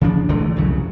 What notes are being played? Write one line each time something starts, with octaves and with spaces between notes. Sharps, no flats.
C#3 F3 D4
D3 E3 G#3 A3
C2 F2 C#3 F#3